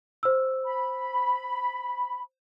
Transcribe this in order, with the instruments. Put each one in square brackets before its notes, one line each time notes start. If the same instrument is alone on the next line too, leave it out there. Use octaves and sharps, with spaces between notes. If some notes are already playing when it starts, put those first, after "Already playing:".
[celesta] C5 E6
[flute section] B5